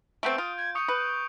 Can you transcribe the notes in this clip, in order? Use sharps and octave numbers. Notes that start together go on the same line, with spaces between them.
A3 B3 C4 E6 G6 D7
F4 D#6
G#6
C#6 D#6 G6 C#7
B4